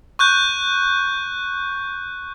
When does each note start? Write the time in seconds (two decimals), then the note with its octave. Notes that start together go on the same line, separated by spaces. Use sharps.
0.19 C#6 F#6 G6